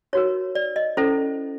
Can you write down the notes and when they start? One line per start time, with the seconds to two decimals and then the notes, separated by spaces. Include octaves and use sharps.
0.13 D#4 F#4 A#4 C#5
0.55 D5
0.76 D#5
0.97 C#4 E4 A4 C5